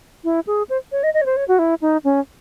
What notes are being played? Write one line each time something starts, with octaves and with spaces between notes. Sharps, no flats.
E4
G#4
C5
C#5
D#5
D#5
C#5
C5
C#5
F#4
E4
D#4
C#4